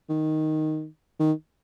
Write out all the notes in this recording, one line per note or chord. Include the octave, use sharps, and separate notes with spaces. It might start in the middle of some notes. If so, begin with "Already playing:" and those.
D#3
D#3